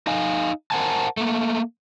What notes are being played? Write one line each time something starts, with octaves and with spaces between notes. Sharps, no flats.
D#4 D#5 F5 G#5
A#4 C5 F#5 G#5 A5
A3 A#3